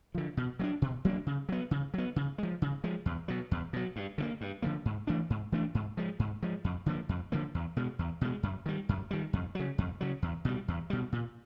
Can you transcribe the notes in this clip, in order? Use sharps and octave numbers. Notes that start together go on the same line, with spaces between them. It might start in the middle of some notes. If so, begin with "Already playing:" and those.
D3 F3
B2
F#3 A#3 D4
B2
F#3 A#3 D4
C#3
F#3 B3
C#3
F#3 B3
C#3
F3 G#3
C#3
F3 G#3
E2
B2 F#3
E2
B2 F#3
G2
D3 F3 A#3
G2
D3 F3 A#3
G#2
E3 A3 D4
G#2
E3 A3 D4
G#2
F3 G#3
G#2
F3 G#3
F2
D3 F3 A#3
F2
D3 F3 A#3
E2
B2 G#3
E2
B2 G#3
F#2
D#3 G3
F#2
D#3 G3
F2
C#3 F#3
F2
C#3 F#3
E2
B2 G3
E2
B2 G3
A#2